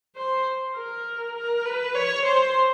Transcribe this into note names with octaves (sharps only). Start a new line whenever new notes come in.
C5
A#4
A#4
B4
C#5
C5